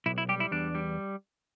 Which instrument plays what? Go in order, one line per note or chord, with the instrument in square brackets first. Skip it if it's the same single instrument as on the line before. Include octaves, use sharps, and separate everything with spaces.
[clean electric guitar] B1 E4
E4
G3 G4
E4
E2 D4
G3